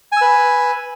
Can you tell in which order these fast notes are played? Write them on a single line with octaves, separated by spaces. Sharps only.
G#5 E6 B4